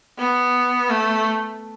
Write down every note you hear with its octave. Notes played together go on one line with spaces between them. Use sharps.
B3
A3